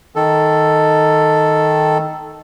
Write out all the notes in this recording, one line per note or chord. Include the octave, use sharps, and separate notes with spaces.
D#3 A4